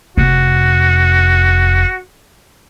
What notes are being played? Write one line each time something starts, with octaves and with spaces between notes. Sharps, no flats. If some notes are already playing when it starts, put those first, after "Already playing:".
F1 F#4